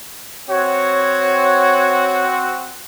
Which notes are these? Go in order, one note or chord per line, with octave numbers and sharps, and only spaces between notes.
C4 F#4 C#5